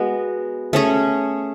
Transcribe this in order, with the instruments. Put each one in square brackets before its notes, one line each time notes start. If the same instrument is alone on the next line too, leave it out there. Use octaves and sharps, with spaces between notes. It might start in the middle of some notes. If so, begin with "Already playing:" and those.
Already playing: [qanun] G#3 B3 F#4
A3 C#4 G#4 C#5